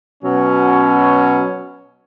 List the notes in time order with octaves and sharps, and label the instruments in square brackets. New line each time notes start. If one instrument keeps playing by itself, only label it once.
[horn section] B2 F#3 C#4